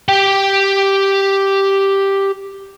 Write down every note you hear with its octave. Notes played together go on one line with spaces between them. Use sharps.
G4 G5